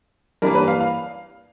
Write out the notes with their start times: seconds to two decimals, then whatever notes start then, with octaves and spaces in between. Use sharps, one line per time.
0.42 G2 E3 G3 A#3 A#4
0.55 B4
0.68 F5
0.81 F5